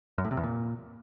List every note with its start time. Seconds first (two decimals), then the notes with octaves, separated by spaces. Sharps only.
0.18 F#2
0.25 A2
0.31 C3
0.37 E2
0.43 A#2